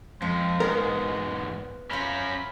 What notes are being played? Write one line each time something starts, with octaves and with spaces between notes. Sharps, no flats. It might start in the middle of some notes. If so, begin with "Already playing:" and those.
F2 F3 G#3
E2 G#2 B3 F4 G#4 A#4
C#4 F4 A#4 C5 E5 B5